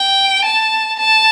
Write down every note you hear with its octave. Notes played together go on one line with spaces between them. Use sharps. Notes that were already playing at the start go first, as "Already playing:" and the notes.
Already playing: G5
A5
A5